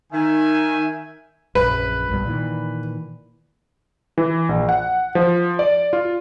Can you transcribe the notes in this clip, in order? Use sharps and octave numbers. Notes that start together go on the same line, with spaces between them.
D#3 E5 G#5
A#1 F#2 B4
B1 G2 B2
A#2 D#3 E3
E3
A#1
F#5
F3
D5
F4